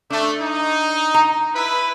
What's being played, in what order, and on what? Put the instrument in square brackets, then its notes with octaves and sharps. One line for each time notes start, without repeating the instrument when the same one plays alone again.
[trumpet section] A3 [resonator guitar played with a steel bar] D4
[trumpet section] D#4
[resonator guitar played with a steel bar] A#5
[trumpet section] E4 B4